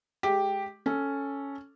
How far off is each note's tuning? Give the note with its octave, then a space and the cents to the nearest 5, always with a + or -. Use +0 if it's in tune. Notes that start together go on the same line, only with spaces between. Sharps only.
G#3 +25 G4 +0
C#4 +0 A4 +0